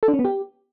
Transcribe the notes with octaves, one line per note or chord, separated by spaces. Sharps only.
A4
D4
C#4
B3
G4